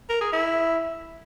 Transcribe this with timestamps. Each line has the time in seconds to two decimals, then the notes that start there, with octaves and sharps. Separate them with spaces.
0.10 A#4
0.21 G#4
0.33 E4